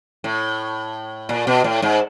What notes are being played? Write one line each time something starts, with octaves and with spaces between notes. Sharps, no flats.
A2
A#2
B2
A2
G#2